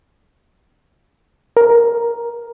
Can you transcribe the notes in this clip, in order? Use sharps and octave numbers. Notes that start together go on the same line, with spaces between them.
A#4